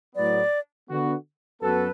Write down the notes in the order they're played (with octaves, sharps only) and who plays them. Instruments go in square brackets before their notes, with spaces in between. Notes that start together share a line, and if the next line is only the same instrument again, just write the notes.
[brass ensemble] A2 F#3 B3 [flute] D5
[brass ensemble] D3 B3 F#4
[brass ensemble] F#2 B3 F#4 A4 [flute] B4